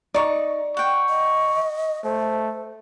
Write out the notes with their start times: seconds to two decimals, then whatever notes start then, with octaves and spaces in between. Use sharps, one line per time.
0.14 D#4 D5 C#6
0.77 F#5 G5 C#6
1.09 D#5
2.04 A3 C5